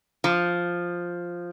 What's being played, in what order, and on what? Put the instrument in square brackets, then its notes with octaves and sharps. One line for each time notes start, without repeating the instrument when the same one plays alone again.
[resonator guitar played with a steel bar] F3